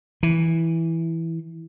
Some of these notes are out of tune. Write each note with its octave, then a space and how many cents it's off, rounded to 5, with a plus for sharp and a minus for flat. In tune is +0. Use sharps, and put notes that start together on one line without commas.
E3 -5